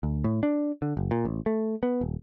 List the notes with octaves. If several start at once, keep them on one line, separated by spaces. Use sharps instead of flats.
D2
A2
D4
D3
F#1
A#2
A1
A3
B3
D#1